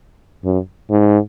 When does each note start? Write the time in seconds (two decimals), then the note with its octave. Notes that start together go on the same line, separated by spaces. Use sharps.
0.44 F#2
0.90 G#2